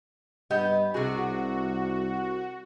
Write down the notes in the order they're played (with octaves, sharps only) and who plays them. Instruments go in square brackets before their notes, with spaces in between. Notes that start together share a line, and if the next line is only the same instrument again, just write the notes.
[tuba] G2 [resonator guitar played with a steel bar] B3 G4 D#5
[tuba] C2 [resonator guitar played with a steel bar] C3 G#4 [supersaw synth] F#4